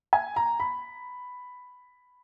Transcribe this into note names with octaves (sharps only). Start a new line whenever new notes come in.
G#5
A#5
B5